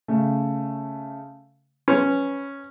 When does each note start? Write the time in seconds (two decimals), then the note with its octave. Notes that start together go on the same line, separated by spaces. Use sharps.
0.08 C#3 A3
1.88 C#4 B4